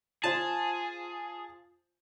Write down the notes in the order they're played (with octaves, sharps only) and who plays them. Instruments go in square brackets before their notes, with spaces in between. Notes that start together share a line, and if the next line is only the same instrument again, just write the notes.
[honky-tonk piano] F4 C5 [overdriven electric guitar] G#4 [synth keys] A5